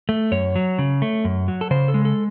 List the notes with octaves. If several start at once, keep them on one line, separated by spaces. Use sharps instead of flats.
A3
F#2 C#5
F#3
C#3
A3
F#2
F#3
A4
C#3 C5
A4
G#3
A4